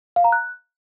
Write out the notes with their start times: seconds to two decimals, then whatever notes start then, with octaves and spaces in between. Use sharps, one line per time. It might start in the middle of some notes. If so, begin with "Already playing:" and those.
0.16 F5
0.24 A#5
0.32 F#6